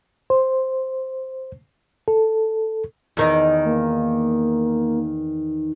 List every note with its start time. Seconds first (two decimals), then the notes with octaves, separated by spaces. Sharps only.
0.30 C5
2.08 A4
3.17 E2 D#3 D#4
3.66 A#3